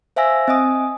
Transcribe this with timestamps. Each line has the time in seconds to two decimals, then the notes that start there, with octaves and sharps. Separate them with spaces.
0.16 C5 E5 F5 G#5 E6 A#6
0.48 C4 D#5 G#5 D#6